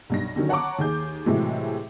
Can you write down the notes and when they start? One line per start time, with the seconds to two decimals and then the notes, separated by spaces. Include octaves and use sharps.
0.10 B1 G2 A#6
0.36 D3 D#3 F#3 C#4
0.49 C#5 F#5 A5 A#5 C#6 D6
0.79 D#2 G#4 G6
1.26 A2 C3 E3 F#3 G#3